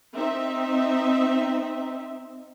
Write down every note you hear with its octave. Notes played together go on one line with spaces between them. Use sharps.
C4 D#4 E5